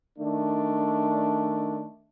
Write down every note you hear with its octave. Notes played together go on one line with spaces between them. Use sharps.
D#3 A3 D4